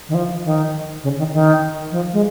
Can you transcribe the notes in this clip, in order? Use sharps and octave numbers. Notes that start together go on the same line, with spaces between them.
D#3
F3
D#3
C#3
D#3
D#3
F3
G#3